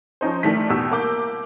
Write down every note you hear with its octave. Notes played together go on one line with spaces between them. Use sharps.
F3 C#4 D#4 C5
D#3 E3 G3 A3 B6
E2 B2 G4 E6
C2 A#3 D6 G6